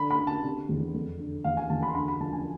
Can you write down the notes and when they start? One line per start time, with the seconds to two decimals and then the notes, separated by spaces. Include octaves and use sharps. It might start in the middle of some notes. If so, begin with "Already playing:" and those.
Already playing: D3 B5
0.11 B5
0.19 D3
0.27 A5
0.44 C3
0.69 E2
0.94 F2
1.19 D3
1.44 E2 F5
1.57 G#5
1.70 E2 A5
1.83 B5
1.89 C6
1.95 D2 B5
2.08 B5
2.20 F3 A5
2.33 G#5